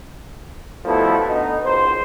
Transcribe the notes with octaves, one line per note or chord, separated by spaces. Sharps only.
B2 F3 G3 A3 E4
D2 B3 D#4
G#1 C#2 C5